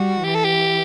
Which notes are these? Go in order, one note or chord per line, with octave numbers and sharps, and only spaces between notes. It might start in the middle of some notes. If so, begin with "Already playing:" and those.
Already playing: G3 F#4
E3 G4
A4
G4